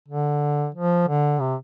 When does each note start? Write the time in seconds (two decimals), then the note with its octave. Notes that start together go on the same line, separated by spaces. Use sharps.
0.09 D3
0.75 F3
1.08 D3
1.41 C3